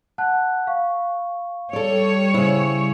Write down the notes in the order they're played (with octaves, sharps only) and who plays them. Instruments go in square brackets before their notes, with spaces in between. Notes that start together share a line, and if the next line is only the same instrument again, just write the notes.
[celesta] F#5 A5 F#6
F5 C#6
[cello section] G3 C#5 [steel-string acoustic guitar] A4 D5
[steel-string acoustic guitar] C#3 E4 [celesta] C5